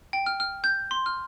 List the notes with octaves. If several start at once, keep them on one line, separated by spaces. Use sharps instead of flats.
G5
F6
F6
G6
C6
F6